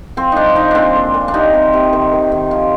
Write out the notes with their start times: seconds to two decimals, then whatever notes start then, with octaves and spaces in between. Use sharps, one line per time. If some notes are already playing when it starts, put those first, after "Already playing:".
0.17 F3 C4
0.32 F3 D4 D#4
0.55 F3 D#4
0.71 A#2 C4 D4
0.95 A#2
1.14 A#2
1.28 D4
1.34 C3 D#4
1.54 C3
1.73 C3
1.93 D#3
2.12 D#3
2.32 D#3
2.51 F3